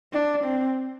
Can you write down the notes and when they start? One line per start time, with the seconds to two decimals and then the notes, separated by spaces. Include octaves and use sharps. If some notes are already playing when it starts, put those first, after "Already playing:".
0.13 D4
0.44 C4